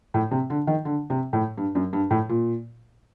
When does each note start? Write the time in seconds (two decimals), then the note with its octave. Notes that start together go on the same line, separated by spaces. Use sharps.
0.14 A2
0.31 C3
0.50 D3
0.67 D#3
0.85 D3
1.10 C3
1.33 A2
1.58 G2
1.75 F#2
1.93 G2
2.11 A2
2.29 A#2